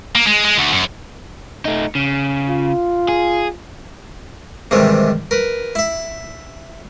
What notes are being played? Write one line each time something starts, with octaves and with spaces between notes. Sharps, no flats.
A#3
G#3
G#3
D2
F#2
A3 D#4
C#3
F4
G#4
G#2 C3 D#3 E3 G3
A#4 B4
E4 E5